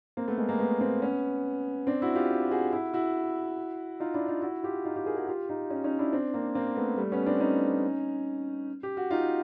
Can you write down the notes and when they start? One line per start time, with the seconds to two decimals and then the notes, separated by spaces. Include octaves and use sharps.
0.17 A#3 C4
0.27 A3 B3
0.38 G#3 A#3
0.49 G#3 A#3
0.59 A3 B3
0.81 A#3 C4
1.02 B3 C#4
1.87 C4 D4
2.02 E4 F#4
2.15 F4 G4
2.51 F#4 G#4
2.72 E4 F#4
2.93 E4 F#4
4.00 D#4 F4
4.14 D4 E4
4.28 D#4 F4
4.42 E4 F#4
4.63 F4 G4
4.85 D#4 F4
4.96 F4 G4
5.06 G#4 A#4
5.17 F#4 G#4
5.28 F4 G4
5.49 D#4 F4
5.70 C#4 D#4
5.84 C#4 D#4
5.99 D4 E4
6.13 C4 D4
6.34 A#3 C4
6.55 A#3 C4
6.76 A3 B3
6.98 G3 A3
7.12 B3 C#4
7.26 C4 D4
7.40 C#4 D#4
8.83 G4
8.97 F#4
9.11 D#4 F4